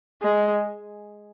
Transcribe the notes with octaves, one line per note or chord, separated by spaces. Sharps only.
G#3